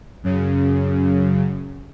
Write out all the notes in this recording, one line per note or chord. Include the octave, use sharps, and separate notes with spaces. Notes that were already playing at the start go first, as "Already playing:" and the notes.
F#2 C#3